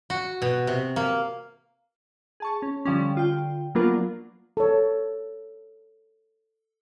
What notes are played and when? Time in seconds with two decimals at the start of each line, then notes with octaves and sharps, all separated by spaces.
0.10 F#4
0.42 B2
0.67 C3
0.96 A#3
2.40 G#4 A5 C#6
2.62 C#4
2.85 D3 F3 G3 C#4
3.15 D3 F4 G5
3.75 F#3 A#3 B3 D4 F4 A#4
4.57 A4 C#5